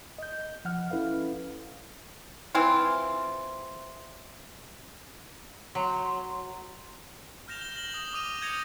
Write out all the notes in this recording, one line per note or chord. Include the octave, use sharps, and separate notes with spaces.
D#5 G6
F3 F#5 F6
C#4 E4 A4 B4 F5
E3 C4 E4 F4
F#3 C6
F6 G6 A#6 E7 F7
G7
A#6 F#7
D#6
D6 D#6 D#7 F7
G6 G#6 A#6 C#7 F7